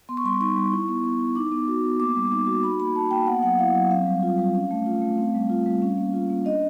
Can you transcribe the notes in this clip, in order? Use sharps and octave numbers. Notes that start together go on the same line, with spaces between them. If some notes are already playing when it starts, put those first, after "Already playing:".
B3 C6
C#6
G3 C6
D#4 C#6
G3
E4
B3
B3
E4
D#4 D6
B3
F#4
B3
A#3 D6
G3
D#4 D6
F#4
D#4 B5
A#3 B5
F#4 A5
A#3 G5
B3 F#5
F#3 F#5
E4 F5
F#3
C4 F5
G3
F4
G3
C#4
A3
F4
A3
C4
G3
F4
G3
C#4
A#3
F4
A#3
D4 D#5